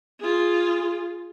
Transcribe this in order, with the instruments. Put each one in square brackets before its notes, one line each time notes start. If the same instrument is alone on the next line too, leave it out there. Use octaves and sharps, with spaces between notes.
[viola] F4 G#4